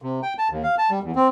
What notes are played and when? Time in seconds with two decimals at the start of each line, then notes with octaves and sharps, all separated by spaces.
0.02 C3
0.23 G5
0.38 A5
0.50 D#2
0.63 F5
0.78 A5
0.91 G3
1.03 E2
1.15 C4